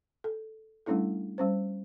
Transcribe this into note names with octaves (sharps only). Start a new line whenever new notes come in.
A4
G3 A3 C#4 D4 E4 A4
G3 C#4 C5